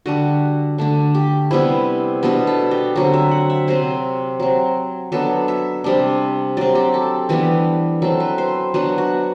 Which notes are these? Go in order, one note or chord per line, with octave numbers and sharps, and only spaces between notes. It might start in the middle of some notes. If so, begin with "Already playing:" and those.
D3 G3 D4 F#4
D3 A3 D4
G4
C3 G3 B3 E4
B2 G3 B3 D4
A4
G4
D3 F#3 C4 F#4
E5
F#5
E5
C3 F#3 C4 C5
F#3 C4
F#3 B3 D4 A4
E5
C3 G3 D4
F#3 C4 D5
G4
A4
E3 G3 B3 D4 G4
F#3 C4 A4
B4
C5
F#3 B3 D4 F#4
F#4